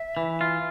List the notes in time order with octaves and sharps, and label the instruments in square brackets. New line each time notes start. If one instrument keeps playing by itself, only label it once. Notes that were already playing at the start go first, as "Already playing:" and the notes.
Already playing: [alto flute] E5
[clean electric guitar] E3
F4